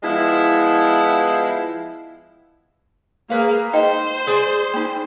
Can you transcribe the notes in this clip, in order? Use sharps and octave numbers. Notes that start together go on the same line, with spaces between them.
F3 G#3 B3 E4
A#3 G#4 B4 F5
D#4 C5 D#5 G5
G#4 D5
A#3 D#4